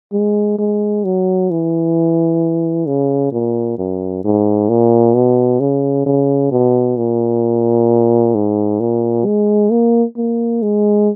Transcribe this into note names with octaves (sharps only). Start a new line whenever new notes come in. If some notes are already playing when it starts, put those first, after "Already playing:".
G#3
G#3
F#3
E3
C#3
A#2
F#2
G#2
A#2
B2
C#3
C#3
B2
A#2
G#2
A#2
G#3
A#3
A#3
G#3